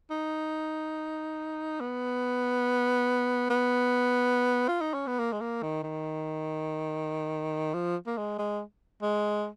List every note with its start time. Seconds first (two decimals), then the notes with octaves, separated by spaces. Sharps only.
0.11 D#4
1.80 B3
3.50 B3
4.68 F4
4.81 D#4
4.94 C#4
5.07 B3
5.19 A#3
5.33 G#3
5.41 A#3
5.62 D#3
5.83 D#3
7.74 F3
8.07 A#3
8.18 G#3
8.39 G#3
9.02 G#3